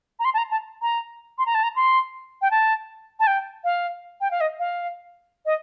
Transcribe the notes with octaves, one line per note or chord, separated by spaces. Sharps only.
A#5
C6
A5
A#5
A5
A#5
C6
A#5
A5
A#5
C6
G5
A5
A5
G5
F5
G5
F5
D#5
F5
D#5